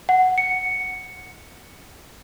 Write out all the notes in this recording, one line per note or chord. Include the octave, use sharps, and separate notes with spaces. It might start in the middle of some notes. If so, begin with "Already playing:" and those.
F#5
C#7